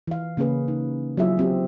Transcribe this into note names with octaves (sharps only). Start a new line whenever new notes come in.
E3 F5
C#3 A#3 C#4 G#4 B4
D#4
F#3 B3 E4 F4 G#4 E5
F#3 C4 G4